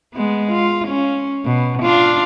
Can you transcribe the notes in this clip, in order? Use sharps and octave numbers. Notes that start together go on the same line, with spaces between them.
G#3 B3
F4
C#4
B2
D4 F4